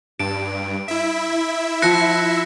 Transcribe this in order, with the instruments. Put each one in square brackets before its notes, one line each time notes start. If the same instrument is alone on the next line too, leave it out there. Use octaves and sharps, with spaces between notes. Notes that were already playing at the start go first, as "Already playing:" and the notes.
[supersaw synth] G2 [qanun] A5 [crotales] D7
[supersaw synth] E4 E5
[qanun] F3 F#5 [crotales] F#6 A#6 C#7